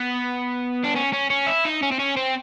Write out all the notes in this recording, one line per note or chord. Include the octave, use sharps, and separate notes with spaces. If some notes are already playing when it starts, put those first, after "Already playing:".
Already playing: B3
D4
C#4
C#4
C#4
E4
D#4
C#4
C4
C#4
C4